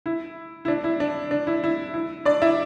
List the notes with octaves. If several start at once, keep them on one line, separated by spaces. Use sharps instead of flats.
E4
E4
D4
E4
D4
D4
E4
E4
E4
D4 D5
E4 E5